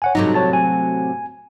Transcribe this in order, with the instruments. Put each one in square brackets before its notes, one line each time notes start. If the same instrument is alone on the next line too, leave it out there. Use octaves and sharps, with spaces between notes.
[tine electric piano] C#5 F#5 G#5
[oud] A2 C3 F#3 [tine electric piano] D#4
[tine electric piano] C#5 A5 A6
G#5